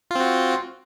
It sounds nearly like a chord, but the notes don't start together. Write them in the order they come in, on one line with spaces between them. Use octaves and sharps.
F4 C4 F#4